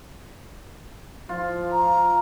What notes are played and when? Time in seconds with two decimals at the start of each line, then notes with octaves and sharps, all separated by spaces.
1.29 F3 F4
1.71 A#5